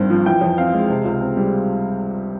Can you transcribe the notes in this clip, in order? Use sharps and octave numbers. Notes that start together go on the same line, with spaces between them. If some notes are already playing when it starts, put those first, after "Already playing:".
Already playing: G#1 G2 C4
F3
E3 G5
F2
C4 F5
G#3
C3
C#2
C4
G3